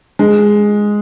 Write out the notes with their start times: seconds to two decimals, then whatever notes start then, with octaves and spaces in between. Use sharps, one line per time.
0.19 G#3